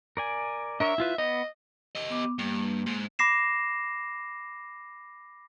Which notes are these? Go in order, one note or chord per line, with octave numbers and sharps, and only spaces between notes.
A#4 D5 G#5
D4 A#4 C#5 E5
E4 F4 B4
B3 D#5
G4 D#5
B3 D6
G2 A#3
G#2
B5 D6 A#6 C7 E7